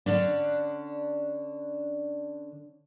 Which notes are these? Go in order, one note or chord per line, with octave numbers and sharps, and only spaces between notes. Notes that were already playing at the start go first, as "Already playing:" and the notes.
D3 C#4 D4